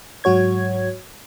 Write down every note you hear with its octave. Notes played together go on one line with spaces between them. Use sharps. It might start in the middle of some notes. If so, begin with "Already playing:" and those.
G#2 F#3 F#4 C#5 G#6